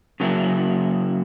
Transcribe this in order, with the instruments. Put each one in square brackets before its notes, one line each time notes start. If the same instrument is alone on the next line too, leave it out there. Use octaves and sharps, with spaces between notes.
[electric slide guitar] C#3 F#3 A#3 E4